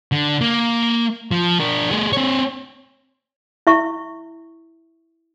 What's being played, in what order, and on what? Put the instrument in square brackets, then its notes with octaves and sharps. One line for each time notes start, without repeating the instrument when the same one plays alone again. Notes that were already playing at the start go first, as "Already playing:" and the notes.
[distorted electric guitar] D3
A#3
F3
D4 A#4
A3 G#4
C4 C#5
[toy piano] E4 E5 C#6